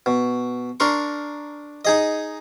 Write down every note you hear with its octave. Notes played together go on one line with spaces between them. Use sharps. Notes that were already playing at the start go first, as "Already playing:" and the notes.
B2
D4 A#4 C6 C#6
D#4 G#4 D#5